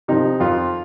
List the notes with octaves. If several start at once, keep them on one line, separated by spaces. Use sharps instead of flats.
C3 F3 D#4
F2 F4